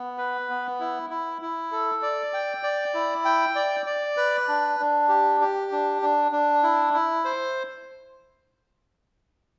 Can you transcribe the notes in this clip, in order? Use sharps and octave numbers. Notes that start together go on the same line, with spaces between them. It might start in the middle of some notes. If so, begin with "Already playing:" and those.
Already playing: B3
B4
B3
E4
E4
E4
A4
D5
G5
D5
E4
G5
D5
D5
B4
D4
D4
G4
G4
D4
D4
D4
E4
E4
C5